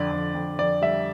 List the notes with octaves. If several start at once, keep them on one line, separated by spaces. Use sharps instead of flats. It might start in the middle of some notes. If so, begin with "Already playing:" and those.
Already playing: F2 D3 D5
F2
F2
F2 D5
G3 E5